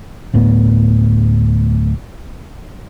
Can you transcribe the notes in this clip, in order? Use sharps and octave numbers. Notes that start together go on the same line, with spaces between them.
D1 A2 B3